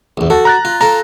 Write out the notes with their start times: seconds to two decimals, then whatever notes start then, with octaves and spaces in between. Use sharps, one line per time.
0.17 A#1 E2
0.30 F#4 A4 A5
0.45 A#5 F#6 A6
0.65 F4
0.81 F4 A4 A#5